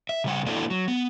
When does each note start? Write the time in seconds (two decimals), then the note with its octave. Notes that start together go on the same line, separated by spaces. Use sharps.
0.09 E5
0.24 C#3 G3 F#5
0.46 A#3 D4 E4 F#4 A4 C5
0.70 F#3
0.88 B3